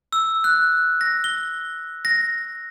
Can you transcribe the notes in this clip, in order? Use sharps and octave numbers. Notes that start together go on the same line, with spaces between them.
E6
F#6
A#6
G7
A#6